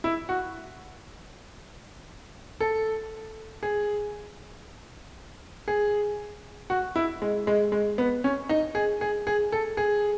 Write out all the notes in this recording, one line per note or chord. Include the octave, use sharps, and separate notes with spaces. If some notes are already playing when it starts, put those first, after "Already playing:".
E4
F#4
A4
G#4
G#4
F#4
E4
G#3
G#3
G#3
B3
C#4
D#4
G#4
G#4
G#4
A4
G#4